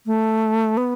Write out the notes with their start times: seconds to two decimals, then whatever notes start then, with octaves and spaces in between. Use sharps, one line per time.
0.06 A3
0.77 B3